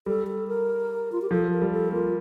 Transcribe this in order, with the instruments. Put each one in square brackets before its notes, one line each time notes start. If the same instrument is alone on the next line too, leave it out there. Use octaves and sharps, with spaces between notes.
[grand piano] G3 [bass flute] A4
[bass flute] A4
A#4
F4
G4
[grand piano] F3 [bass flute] A4
[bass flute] A#4
[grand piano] G3
[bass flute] A4
[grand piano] A#3 [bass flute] F4